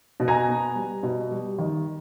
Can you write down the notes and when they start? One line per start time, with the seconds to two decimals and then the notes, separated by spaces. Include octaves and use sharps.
0.20 B2
0.28 G#5 A#5
0.49 B3
0.75 G3
1.03 B2
1.31 G3
1.59 D#3